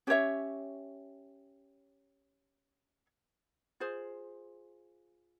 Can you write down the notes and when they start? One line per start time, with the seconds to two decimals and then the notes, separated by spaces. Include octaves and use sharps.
0.07 C#4 G4 C#5 E5
3.80 F4 G#4 C5